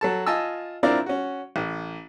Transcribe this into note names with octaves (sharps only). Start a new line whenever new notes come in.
F#3 A4 A5
F4 D#5 G#5 A5 E6
C4 D4 E4 F4 A#4 D5
C#4 F#4
A1